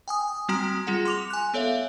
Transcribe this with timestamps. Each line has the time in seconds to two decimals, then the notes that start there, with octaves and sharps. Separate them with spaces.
0.08 G5 G#5 D#6
0.49 G3 C4 F#4 G5 A#5 D#6
0.87 G3 F4 G#4 F#5
1.05 C6 D6 F7
1.30 G#5 F#6
1.54 B3 A4 C#5 E5 F5